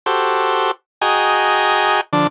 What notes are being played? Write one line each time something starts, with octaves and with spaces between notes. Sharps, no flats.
F#4 G4 A4 C5
F#4 G#4 D#5 G5 G#5 A#5
D3 F3 D4 D5